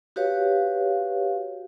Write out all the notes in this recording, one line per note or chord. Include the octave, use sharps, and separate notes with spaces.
F#4 G4 B4 C#5 F5